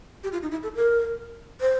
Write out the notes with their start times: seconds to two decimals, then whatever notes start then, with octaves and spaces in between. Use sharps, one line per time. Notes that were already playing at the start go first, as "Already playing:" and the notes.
0.24 G4
0.32 F4
0.43 D#4
0.51 E4
0.63 A4
0.75 A#4
1.61 C5